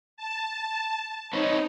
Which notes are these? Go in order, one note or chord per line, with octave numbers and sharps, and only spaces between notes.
A5
C4 D#4 B4 C#5